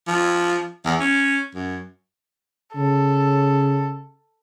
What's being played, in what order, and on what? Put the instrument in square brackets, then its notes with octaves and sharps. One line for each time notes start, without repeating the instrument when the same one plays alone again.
[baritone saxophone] F3
E2
C#4
F#2
[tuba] C#3 [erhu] A4